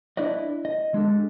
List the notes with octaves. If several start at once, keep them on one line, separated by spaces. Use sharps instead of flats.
D4 E4 B4 D5 D#5
D#5
G#3 D4 G4 A4